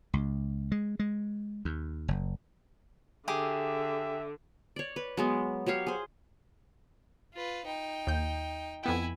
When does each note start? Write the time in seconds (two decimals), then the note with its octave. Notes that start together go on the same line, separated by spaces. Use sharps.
0.13 C#2
0.72 G#3
0.99 G#3
1.65 D#2
2.08 F#1
3.28 D3 G4 G#4 E5 D6
4.76 C#5 D5
4.96 B4
5.17 F#3 G#3 B3
5.66 F#3 G4 C#5 F5
5.87 G#4 C5
7.34 F4 B4
7.65 D#4 G5
8.07 D#2 G6
8.83 F2 B3 E4 G5 G#5